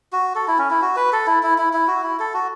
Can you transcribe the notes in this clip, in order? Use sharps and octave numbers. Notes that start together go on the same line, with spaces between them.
F#4
A4
E4
C#4
E4
F#4
B4
A4
E4
E4
E4
E4
F#4
E4
A4
F#4